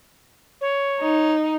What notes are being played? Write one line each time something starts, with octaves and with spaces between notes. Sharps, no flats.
C#5
D#4